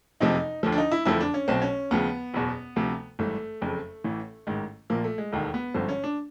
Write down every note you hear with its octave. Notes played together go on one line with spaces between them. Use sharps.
F#1 F2 C3 F3 D#4
D#2 D3 F3
D4
D#4
E4
F#1 F2 D3 F3 E4
D4
C#4
B1 B2 C4
C#4
D#2 C#3 F3 B3
F#1 E2 B2
D2 C3 F3
G#1 G2 E3 A3
F#1 F2 C#3
A1 A2 E3
A1 G#2 D#3
A#1 A#2 F3 A#3
A3
G#3
E1 D#2 D#3 A3
B3
G#1 G2 D3 F3 C4
C#4
D4